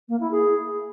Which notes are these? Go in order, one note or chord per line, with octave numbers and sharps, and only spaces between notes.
A#3
E4
G#4